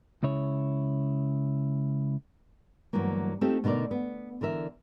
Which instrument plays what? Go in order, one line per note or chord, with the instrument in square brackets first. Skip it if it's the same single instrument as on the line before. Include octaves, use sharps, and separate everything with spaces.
[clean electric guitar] C#2 C#3 E4 C#5
[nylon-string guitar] D2 G2 E3 F#3 A#3
A3 C4 D#4 F4 G4 A4
B2 D3 D#4 A#4 D5
B3
D3 E3 A#4 E5